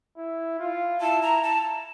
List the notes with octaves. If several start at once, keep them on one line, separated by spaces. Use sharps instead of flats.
E4
F4
E4 A5
A#5
A5